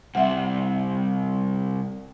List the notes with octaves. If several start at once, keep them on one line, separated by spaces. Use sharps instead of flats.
C3 G3 C4 E5 F#5